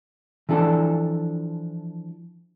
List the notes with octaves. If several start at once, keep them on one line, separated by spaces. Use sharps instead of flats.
E3 F3 D4 A4